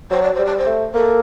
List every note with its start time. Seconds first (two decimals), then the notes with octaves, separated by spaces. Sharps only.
0.10 F#3 C5
0.22 D5
0.35 G3 C5
0.45 D5
0.58 C5
0.66 A3
0.94 A#3 A4